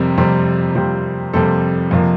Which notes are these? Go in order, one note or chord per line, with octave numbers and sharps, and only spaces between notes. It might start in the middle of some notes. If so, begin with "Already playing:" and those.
Already playing: F2 C3 G3 C4 A#4
F2 C3 G3 C4
F2 C3 G3 C4
F2 C3 G3 C4 A4
F2 C3 F3 A#3